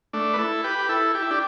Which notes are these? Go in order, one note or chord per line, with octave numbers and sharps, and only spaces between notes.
A3 D4
B4
E4 A4
G4 B4
G4
E4 A4
G4
E4
D4 G4